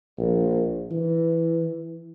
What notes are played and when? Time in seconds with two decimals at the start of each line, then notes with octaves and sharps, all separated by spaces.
0.18 A#1
0.91 E3